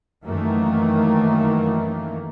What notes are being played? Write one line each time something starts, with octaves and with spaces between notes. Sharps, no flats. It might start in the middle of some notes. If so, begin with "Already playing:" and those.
F#2 D#3 E3 A3 A#3